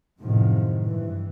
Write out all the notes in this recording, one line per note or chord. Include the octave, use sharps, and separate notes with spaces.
F#2 A2 C3 D#3 F3
G2 E3